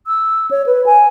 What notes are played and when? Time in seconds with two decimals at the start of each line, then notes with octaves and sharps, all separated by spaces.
0.07 E6
0.51 C#5
0.66 B4
0.86 G#5